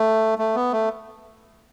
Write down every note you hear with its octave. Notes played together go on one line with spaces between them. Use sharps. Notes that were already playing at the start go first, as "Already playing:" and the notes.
Already playing: A3
A3
B3
A3